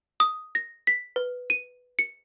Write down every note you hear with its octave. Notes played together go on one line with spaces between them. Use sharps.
D#6
A#6
B6
B4
D#7
C#7